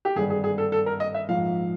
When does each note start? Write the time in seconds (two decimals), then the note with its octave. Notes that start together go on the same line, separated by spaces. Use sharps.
0.05 G4
0.16 G#1 G2 D3 G#4
0.30 G#4
0.44 G#4
0.58 A4
0.72 A4
0.86 A#4
1.00 D#5
1.14 E5
1.29 A#1 G#2 F3 F5